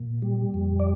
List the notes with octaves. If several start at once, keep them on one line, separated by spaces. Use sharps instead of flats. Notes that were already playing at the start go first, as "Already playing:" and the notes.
Already playing: A#2
G3
F2
D5